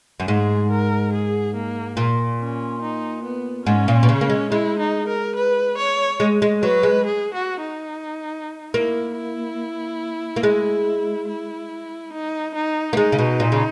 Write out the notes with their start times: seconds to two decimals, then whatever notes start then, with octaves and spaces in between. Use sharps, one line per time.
0.20 F#2
0.28 G#2 G#4
0.71 A#4
1.13 G#4
1.55 A#3
1.97 A#2
2.40 C#4
2.82 D#4
3.24 B3
3.66 G#2 C#4
3.88 A#2
4.03 B2
4.09 C#3
4.21 A#3
4.30 G#3
4.50 G#3 E4
4.79 D#4
5.08 A#4
5.36 B4
5.77 C#5
6.20 G#3
6.42 G#3
6.63 F#3 B4
6.83 G#3
7.06 G#4
7.34 F#4
7.61 D#4
8.74 A#3 E4
9.17 E4
10.36 A#3
10.43 G#3
11.29 E4
12.13 D#4
12.55 D#4
12.93 A#3
12.97 G#3 D#4
13.12 C#3
13.18 B2
13.40 A#2
13.52 C#3